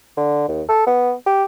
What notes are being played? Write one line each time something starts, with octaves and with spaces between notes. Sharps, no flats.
D3
D#2
A4
B3
G4